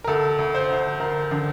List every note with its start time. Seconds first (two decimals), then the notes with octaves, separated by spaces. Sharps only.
0.04 A#4
0.07 D2 A4
0.39 D2
0.54 C5
0.69 D2
1.00 D2 A#4
1.31 D3